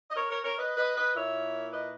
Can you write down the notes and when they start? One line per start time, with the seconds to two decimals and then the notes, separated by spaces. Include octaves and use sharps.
0.11 D#5
0.16 A#4 C#5
0.31 A#4 C#5
0.44 A#4 C#5
0.58 B4 D#5
0.77 B4 D#5
0.96 B4 D#5
1.15 A#2 A#3 E4 C#5 E5
1.72 B4 D#5